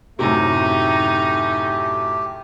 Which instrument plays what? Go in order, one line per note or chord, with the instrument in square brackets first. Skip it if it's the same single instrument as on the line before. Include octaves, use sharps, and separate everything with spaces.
[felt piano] F#2 A2 C3 [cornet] A3 [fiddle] D#4 [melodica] G4